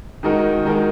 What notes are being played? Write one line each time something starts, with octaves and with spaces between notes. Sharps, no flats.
D#3 G#3 D#4 F#4 A#4
D#3 G#3 D#4 F#4 A#4